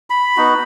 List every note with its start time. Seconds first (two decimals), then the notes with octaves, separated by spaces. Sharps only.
0.10 B5
0.37 B3 D#4 F#4